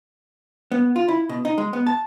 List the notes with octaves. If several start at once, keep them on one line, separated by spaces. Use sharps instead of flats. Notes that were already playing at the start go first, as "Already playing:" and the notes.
B3
F4
E4
B2
D#4
G#3
B3
A5